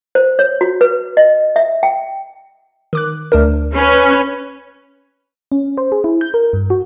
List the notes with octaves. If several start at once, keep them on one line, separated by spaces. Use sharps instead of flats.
C5
C#5
F#4
B4
D#5
E5
G5
D#3 D6 F#6
D2 D4 A#4
C#4 B4
C#4
C5
G#4
E4
G6
A#4
G2
F#4